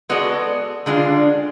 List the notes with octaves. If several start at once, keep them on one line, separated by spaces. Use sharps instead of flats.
G#3 B3 F#4 A4 D5
D3 G#3 D4 F4